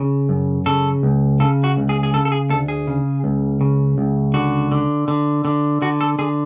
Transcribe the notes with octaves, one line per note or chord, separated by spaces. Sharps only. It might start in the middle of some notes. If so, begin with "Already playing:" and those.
Already playing: C#3
F#2
C#3 A4
C#2
C#3 A4
F#4
C#2
G#4
G#4
C#3 A4
A4
G#4
D2 A4
G#4
C#3
C#2
C#3
C#2
D3 F#4
D3
D3
D3
D3 F#4
A4
D3 G#4